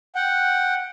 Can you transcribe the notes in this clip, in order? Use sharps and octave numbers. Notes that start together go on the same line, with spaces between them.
F#5 G5